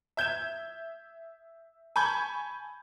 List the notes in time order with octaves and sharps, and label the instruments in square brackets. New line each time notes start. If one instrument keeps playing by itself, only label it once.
[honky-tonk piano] E5 G6 G#6 E7
G#5 A5 B5 C#6 G6 G#6